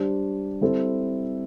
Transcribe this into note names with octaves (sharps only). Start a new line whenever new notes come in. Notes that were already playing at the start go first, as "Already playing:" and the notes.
Already playing: G3 D4 G4 C5
G3 C4 E4 A4 C5